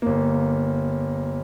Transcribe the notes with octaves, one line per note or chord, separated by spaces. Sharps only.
G1 A#3